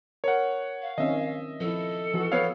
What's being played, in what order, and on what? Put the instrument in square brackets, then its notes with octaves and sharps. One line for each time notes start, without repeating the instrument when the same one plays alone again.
[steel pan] A#4 [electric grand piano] C#5 F#5
[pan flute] F5
[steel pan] D#3 C4 C#4 [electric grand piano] D#5 E5
[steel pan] F3 E4 [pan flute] A4
[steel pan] E3 F3 F#4
[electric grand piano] B3 C#5 F5